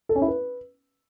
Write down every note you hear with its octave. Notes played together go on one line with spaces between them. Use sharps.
A4
C#4
E4
B4